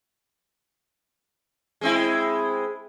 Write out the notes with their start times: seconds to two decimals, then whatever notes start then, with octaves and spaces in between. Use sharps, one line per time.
1.81 G#3 C4 E4